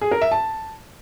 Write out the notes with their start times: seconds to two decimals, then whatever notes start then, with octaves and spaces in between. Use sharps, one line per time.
0.01 G#4
0.11 A#4
0.21 E5
0.32 A5